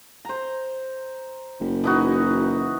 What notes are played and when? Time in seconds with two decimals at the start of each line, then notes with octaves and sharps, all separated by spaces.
0.25 C5 A#5
1.60 F#1
1.84 E3 D#4 F#4